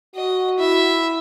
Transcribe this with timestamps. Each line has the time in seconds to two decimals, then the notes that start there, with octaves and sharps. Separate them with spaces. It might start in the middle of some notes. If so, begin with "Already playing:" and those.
0.16 F#4 D#5
0.59 E4 E5